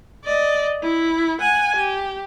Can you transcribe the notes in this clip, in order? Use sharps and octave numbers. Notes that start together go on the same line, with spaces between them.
D5 D#5
E4
F#5 G#5
G4